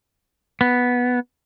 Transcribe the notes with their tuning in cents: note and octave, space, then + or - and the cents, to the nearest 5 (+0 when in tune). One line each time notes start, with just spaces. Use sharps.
B3 -5